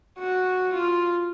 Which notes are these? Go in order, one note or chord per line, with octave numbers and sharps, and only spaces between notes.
F#4
F4